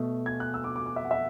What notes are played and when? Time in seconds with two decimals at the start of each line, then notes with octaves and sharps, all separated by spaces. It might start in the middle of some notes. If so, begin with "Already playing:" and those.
Already playing: B2 A3
0.26 G#6
0.40 F#6
0.54 E6
0.64 D6
0.76 D6
0.86 D6
0.96 E5
1.05 F#5
1.11 E5